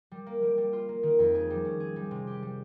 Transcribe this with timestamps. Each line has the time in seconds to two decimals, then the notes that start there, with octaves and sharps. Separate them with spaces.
0.11 G3
0.26 A#3
0.43 G3
0.58 G3
0.73 F4
0.89 A#3
1.03 D#3
1.19 F2
1.35 G#4
1.50 G3
1.65 C#4
1.80 G#4
1.96 G3
2.11 C3
2.27 G4
2.42 G3